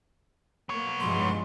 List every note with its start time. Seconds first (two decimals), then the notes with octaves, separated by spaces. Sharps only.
0.69 A#3 B3 C#5
1.00 G2 F3 G#3 C6